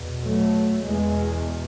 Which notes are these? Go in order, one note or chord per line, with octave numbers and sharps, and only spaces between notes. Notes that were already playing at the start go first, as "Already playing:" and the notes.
Already playing: E2 B2
F#3 A3
E2 B2 E3 G#3